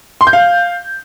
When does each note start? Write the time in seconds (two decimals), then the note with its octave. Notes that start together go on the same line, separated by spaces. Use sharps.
0.21 C6
0.27 G6
0.33 F5